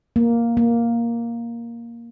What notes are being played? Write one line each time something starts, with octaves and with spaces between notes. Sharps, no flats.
A#3
A#3